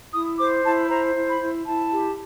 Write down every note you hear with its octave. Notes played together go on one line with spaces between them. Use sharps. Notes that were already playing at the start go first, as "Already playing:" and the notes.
E4 D#6
C5 D6
E4 A5
C5 A#5
E4
B5
E4
E4 A5
G4